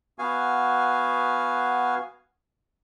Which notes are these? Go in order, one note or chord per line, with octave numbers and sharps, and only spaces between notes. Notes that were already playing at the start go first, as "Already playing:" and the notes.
B3 F#4 F5 G#5